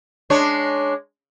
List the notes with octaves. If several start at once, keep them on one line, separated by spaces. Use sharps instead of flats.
G#3 D4 C#5